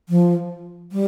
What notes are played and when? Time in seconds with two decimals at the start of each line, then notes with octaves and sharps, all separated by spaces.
0.09 F3
0.92 G3